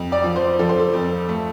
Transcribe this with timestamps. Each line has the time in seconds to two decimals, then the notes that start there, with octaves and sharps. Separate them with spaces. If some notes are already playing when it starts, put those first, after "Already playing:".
Already playing: F2
0.12 D5
0.24 F3
0.36 C5
0.59 F3 A4
0.69 C5
0.79 A4
0.93 F2
1.29 A3